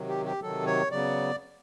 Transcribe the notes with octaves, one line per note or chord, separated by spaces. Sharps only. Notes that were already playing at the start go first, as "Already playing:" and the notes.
Already playing: C3 D#3 F#3
G4
G4
C3 D#3 F#3 A4
C#5
C#3 F#3 B3 D5